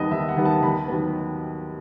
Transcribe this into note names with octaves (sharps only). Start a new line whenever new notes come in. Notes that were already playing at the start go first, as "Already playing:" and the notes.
Already playing: D#2 D#3 G3 B3 A4 B4 D#5
D#2 E5
F#5
D#3 G3 B3
A5
D#2 B5
D#3 F#3 B3